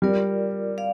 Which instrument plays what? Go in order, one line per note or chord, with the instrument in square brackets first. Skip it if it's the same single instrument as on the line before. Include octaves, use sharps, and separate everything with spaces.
[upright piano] G3 [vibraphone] F4 A#4 D5
[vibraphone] D5 F5